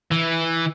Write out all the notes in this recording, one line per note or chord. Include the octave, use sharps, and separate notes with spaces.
E3